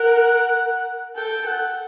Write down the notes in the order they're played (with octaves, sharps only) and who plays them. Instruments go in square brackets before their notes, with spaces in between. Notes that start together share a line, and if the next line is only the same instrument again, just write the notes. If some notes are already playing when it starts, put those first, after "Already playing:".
Already playing: [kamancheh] A#4 [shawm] F#5
[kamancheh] A4 [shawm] G5
[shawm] F#5